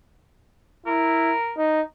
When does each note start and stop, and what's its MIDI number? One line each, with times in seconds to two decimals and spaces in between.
0.86 1.33 64
0.86 1.55 70
1.57 1.81 63